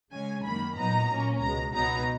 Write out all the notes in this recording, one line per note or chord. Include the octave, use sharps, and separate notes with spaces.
C#3 G#3 C#4 G#5
F#2 D#3 A#3 B5
A#2 F#3 B3 D#4 A#5
A#2 A#3 C#4
C#2 B2 G#3 A#5
C#2 B2 F#3 B3 D#4 A#5